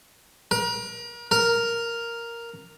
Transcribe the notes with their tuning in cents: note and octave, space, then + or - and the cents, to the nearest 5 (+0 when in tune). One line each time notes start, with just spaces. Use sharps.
A#4 +35
A#4 +0